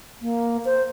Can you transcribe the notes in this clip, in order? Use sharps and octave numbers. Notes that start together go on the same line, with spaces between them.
A#3
C5